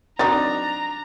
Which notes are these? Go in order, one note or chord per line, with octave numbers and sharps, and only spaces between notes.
F#3 C4 D4 D#4 A#5 A6